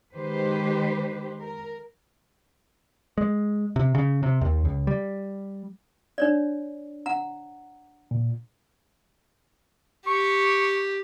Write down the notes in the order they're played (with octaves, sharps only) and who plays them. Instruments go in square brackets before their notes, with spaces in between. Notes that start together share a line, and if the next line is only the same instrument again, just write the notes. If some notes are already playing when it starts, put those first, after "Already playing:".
[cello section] D#3 G#3 G4 B4 C5
A#4
[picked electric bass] G#3
C3
C#3
C3
D#2
C#2
G3
[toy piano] D4 C#5 D5
F#5 A#5
[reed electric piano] A#2
[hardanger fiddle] G4 [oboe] C#6